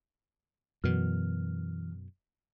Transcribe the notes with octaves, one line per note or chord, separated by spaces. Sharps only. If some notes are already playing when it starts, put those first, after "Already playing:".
F#2 B2 E3 F6